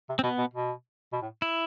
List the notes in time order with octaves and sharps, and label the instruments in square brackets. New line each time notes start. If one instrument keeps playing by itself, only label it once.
[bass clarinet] C3
[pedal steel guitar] C4
[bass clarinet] B2 [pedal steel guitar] B3
[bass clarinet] B2
B2
B2
A2
[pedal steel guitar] E4